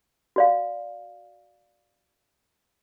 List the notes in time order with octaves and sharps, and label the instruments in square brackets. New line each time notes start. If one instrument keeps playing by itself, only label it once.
[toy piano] F#4 D5 F5